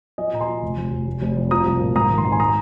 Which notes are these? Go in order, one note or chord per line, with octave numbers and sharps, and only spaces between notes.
F3 D#5 G#5
A#2 A#5
G#5 C6
F3
F1
F1
F1
F1
F1
F2
F3 A#5 D#6
C2
A#2
G#2 A#5 D#6
G#1
C6
G#1 A#5
G#5 C6
A#5 D#6